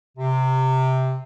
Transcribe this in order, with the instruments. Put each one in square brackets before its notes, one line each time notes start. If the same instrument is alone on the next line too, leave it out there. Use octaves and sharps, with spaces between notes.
[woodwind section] C3